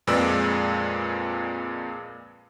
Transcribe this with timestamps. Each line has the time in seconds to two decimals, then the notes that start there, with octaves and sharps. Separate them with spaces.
0.07 F2 A#2 G#3 B4 D5 E6